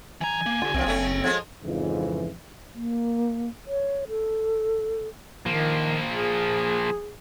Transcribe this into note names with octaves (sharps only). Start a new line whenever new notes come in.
E3 G#5 A#5
A#3
D3 F4 G4
C2 F#2 F3 C4
F#1 C#3 A3 C#4
F3 G#3 G#4 G#6
F2 G#2 C#3 E3
A#3
C#5
A4
D#3 F3 A#3
G#4